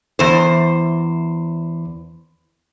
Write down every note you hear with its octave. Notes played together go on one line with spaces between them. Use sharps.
E2 C5